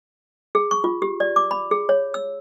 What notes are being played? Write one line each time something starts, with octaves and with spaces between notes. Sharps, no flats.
G#4
C#6
F4
G4
D5
D6
B5
G#4
C#5
E6